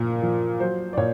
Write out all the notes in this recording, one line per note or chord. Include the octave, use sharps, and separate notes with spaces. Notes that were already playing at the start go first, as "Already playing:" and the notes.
Already playing: A#2 F3 A#4
F3
F#3 C5
D5
A#2 C#5